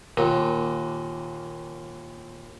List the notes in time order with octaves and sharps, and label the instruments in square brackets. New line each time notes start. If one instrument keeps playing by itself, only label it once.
[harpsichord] D#2 A#2